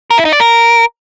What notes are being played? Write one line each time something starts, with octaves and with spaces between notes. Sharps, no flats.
A#4
E4
D#4
D5
A#4